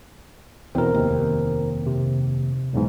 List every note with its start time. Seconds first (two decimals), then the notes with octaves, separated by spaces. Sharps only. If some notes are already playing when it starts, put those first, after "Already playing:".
0.75 E2 B2 C4 A#4
0.94 F1 D#2
1.86 C3
2.73 B1 E2 G#2